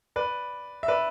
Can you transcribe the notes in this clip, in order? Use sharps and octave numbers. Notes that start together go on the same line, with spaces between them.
B4 D5
E5
B4 D5